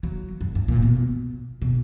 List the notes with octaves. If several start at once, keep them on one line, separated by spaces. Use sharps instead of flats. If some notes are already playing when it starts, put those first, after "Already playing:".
F#3
F#2
G2
A#2
B2
B2